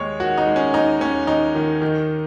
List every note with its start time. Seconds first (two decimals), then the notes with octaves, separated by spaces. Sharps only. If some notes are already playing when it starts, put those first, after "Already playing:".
Already playing: D#2 G#3 C#5
0.20 D#3 F#4
0.38 D#4
0.46 G#3
0.56 C#4
0.73 D#2 D#4
1.01 D#2 C#4
1.27 D#2 D#4
1.55 D#3
1.82 D#3